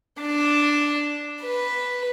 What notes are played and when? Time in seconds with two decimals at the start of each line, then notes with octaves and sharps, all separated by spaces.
0.21 D4
1.42 B4